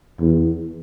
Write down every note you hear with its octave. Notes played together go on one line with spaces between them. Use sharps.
E2